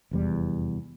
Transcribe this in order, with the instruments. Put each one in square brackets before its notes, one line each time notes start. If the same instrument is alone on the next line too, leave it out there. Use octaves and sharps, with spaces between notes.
[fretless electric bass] F1 E2 G3